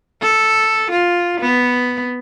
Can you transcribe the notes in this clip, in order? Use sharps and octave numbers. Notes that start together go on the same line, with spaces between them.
A4
F4
B3